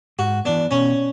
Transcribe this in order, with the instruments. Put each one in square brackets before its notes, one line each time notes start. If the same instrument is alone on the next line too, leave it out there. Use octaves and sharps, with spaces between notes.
[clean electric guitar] G#2 [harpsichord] F#4
[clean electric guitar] E3 B3 [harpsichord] D4
[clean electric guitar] B2 [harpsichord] C#4